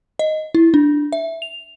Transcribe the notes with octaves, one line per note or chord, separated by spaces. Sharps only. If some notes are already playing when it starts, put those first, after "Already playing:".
D#5
E4
D4
E5
F7